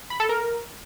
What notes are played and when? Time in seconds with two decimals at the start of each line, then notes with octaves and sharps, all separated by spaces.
0.10 B5
0.20 A4
0.29 A#4